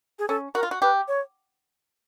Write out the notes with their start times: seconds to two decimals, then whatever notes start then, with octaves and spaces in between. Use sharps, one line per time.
0.19 G#4
0.28 C#4 A4
0.55 F#4 A#4
0.63 F4
0.71 F#4
0.82 G4 B4
1.08 C#5